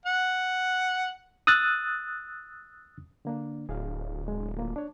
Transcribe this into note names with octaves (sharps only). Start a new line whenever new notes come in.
F#5
D#6 E6 F#6 A6
D3 A#3 D4
D1 G#4 F5
G#3
A3 A#3 F4
D4 C#5